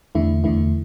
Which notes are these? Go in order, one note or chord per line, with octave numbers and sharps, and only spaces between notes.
E2 D3 A3 E4
E2 D3 A3 E4